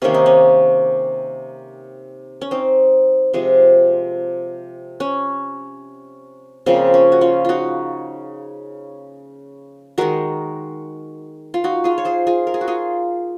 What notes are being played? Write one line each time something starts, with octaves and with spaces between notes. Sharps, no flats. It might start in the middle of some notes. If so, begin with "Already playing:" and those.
C3 D#3 A#3 C#4
D#4
C#4
C#4
C4 D#4
C3 F3 G#3
C#4
C#3 F3 A#3 C4
C#4
F#4
C#4 F4
D#4 F4 F#4
D#3 G#3 F#4 A#4
F4
D#4 F#4
F4 G#4
C#5
G#4 C5
F4 G#4
A#4
G#4
F#4
F4 G#4